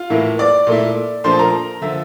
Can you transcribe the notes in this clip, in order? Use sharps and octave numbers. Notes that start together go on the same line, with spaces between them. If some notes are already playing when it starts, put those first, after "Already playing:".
Already playing: F4 F5
A2 E3 A#3 E4
D5 D6
A#2 A3 E4
A#2 F3 A3 D4 C5 C6
A5
A#4 A#5
D3 F3 E5 E6